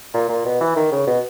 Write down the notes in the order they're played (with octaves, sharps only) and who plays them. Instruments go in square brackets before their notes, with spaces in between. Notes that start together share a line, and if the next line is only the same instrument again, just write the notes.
[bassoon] A#2
A#2
B2
E3
D#3
C#3
B2